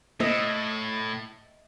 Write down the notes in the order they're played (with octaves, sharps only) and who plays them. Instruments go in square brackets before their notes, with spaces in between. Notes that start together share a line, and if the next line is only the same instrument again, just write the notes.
[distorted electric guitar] A2 [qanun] D#5 E5